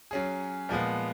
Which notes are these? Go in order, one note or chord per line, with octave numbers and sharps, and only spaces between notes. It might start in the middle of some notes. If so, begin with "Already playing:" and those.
F#3 C#4 G#4
A#2 F3 G#3 B3